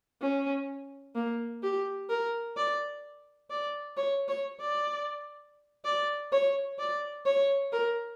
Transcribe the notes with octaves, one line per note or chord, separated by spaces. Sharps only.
C#4
A#3
G4
A#4
D5
D5
C#5
C#5
D5
D5
C#5
D5
C#5
A#4